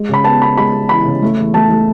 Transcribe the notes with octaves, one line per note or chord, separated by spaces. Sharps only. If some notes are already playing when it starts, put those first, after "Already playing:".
Already playing: G#3
C#3 B5
B3 A5
B3 B5
G#3 B5
B3
E3 B5
C#3
A3
E2
A3 A5
A3